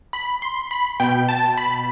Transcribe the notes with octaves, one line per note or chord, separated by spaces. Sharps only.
B5
C6
B5
B2 G5
A5
B5